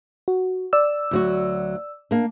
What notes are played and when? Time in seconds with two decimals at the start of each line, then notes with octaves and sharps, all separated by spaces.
0.28 F#4
0.73 D5 E6
1.11 D2 F#3 F#4
2.11 A#3 D4